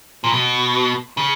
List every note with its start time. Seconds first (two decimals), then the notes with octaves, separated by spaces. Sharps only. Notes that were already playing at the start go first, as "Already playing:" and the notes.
0.24 A#2
0.33 B2
1.17 C#3